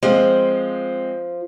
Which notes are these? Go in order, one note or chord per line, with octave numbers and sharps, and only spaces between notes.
F3 G#3 C4